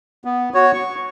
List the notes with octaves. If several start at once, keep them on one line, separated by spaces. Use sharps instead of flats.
B3
F#4 C#5
C#6